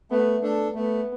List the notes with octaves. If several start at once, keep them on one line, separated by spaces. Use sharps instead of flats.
A3 B3
A3 D4 A4
A3 B3